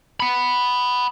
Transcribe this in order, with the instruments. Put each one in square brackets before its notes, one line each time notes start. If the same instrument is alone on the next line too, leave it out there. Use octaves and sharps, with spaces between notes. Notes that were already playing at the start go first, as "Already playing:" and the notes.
[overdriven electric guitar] F#5 B5